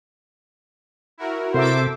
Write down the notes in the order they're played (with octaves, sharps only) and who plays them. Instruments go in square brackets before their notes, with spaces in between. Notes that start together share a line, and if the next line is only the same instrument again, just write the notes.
[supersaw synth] E4 F#4 A#4
[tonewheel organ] C3 [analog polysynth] A4 E5 D6 [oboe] C5